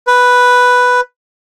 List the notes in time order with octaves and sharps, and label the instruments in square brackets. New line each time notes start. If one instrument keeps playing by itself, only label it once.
[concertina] B4